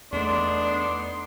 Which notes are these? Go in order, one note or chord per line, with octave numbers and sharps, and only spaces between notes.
E2 A3 B3 D4 D#4 C6